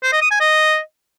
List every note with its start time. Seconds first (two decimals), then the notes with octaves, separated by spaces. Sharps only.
0.03 C5
0.12 D#5
0.21 D#6
0.31 G#5
0.40 D#5